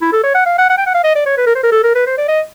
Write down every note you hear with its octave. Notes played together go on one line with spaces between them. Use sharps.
E4
A4
C#5
F#5
F5
F#5
F#5
G5
F#5
F5
D#5
D5
C#5
B4
A#4
C5
A#4
A4
A#4
B4
C5
D5
D#5